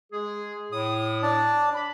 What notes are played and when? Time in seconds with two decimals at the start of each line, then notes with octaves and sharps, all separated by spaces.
0.13 G#3 G#4
0.72 A2 D#6
1.23 D4 D5 A5
1.75 B5